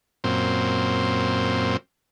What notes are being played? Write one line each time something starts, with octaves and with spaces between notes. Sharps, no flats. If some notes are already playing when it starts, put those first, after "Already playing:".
F#2 A#2 C4